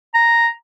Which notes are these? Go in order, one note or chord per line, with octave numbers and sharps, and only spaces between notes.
A#5